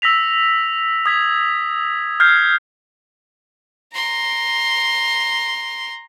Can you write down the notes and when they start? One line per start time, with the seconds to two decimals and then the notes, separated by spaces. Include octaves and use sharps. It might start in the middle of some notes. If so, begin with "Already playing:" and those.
0.02 E6 A#6 B6 F7
1.06 D#6 G#6 B6
2.20 F6 G6 G#6 C7
3.94 A#5 C6